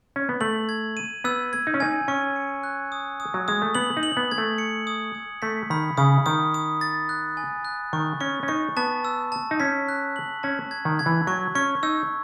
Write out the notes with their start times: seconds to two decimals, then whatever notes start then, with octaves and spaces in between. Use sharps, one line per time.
0.16 C#4
0.29 B3
0.41 A3 F#7
0.69 G#6
0.97 D#7
1.24 B3 E6
1.53 G#6
1.67 D#4
1.74 C#4
1.80 D#4 G#5
2.08 C#4 C#6
2.36 C#7
2.63 F#6
2.92 D#6
3.20 D#6
3.34 F#3
3.48 G#3 D#6
3.62 A3
3.75 B3 F#7
3.97 D#4
4.03 F#7
4.17 B3
4.31 G#6
4.38 A3
4.58 C#7
4.87 D#6
5.15 D#6
5.42 A3 B6
5.70 D#3 B5
5.97 C#3 D#6
6.26 D#3 D#6
6.54 D#6
6.81 A6
7.09 F#6
7.37 G#5
7.65 F#6
7.93 D#3 C#6
8.21 C#4 C#6
8.43 C#4
8.48 D#4 C#6
8.77 B3 A5
9.05 E6
9.32 A5
9.51 D#4
9.60 C#4 B6
9.88 F#6
10.16 F#7
10.43 C#4 A5
10.71 G#6
10.85 D#3
10.99 G#6
11.06 E3
11.27 F#3 C#6
11.55 C#4 C#6
11.83 D#4 E6